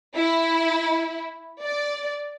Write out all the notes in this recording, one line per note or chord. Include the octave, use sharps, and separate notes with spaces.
E4
D5